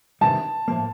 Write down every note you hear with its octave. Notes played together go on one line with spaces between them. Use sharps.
C3 D#3 G3 A5
A2 F3 A#3